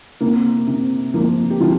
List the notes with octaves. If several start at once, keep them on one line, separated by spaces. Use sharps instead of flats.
C3 A#3
C3
F3 A#3
G4
C3 F3 F4